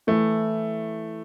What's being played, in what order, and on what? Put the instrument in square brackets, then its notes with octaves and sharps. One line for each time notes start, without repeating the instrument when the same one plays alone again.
[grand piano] E3 A3 E4